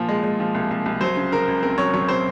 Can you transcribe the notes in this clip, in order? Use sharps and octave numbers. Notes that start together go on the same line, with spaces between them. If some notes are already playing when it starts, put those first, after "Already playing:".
Already playing: A#2 F3
G#3
G#3
F3
C2
C2
C2
F#3 C5
C#3
C#3 A#4
C#2
C4 A#4
F#3 C#5
F#3 C#5
C4 C5